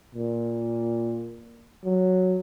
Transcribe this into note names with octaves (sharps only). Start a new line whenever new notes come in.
A#2
F#3